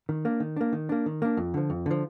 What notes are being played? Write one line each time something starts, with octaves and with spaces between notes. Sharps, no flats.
D#3
A#3 D4
D#3
A#3 D4
D#3
A#3 D4
D#3
A#3 D4
F2
D3 F3
F2
D3 F3